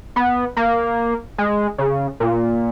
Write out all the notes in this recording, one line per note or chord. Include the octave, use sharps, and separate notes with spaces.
B3
A#3
G#3
C#3
A#2